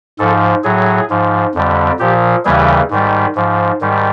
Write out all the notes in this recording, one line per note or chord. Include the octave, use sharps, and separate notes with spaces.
G#2 F3 A4
A2 F#3 G#4
G#2 F3
F2 D3 G3
A#2 F3 G4
D#2 C#3 E3 G3 G#4
G#2 D#3 G3
G#2 F3
G#2 D#3 G3